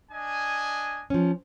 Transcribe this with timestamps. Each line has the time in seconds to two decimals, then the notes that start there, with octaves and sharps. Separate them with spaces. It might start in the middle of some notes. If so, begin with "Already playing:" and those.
0.11 D4 D#5 G#5
1.10 F3 C#4